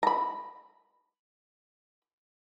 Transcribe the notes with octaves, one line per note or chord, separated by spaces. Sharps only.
A#5 B5